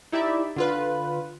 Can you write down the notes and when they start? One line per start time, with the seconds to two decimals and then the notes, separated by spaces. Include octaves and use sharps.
0.12 D#4 E4 G4 D5 E5
0.56 D3 F4 B4